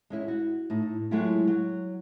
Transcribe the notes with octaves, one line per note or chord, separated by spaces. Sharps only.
G#3 C#4 E4
F#4
A2 D#4
F#3 G#3 A3 E4 F4 G4
F#3